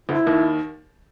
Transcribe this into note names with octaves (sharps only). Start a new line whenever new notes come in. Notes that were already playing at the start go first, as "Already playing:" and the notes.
D2 D3 E4
D#2 D#3